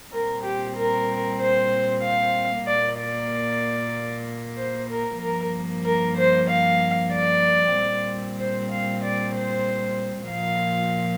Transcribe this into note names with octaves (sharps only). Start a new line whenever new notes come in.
A#2 G3 C4 A#4
G4
A#4
C5
F5
A#2 A#3 D5
D5
C5
A#4
G2 F3 A#3 A#4
A#4
C5
F5
D5
A#2 G3 C4
C5
F5
D5
C5
A#2 F3 A#3 F5